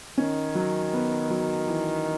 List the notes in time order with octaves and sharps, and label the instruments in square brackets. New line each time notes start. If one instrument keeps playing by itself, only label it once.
[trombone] D#3 [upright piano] C#4
[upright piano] F#3
B3
F#3
E3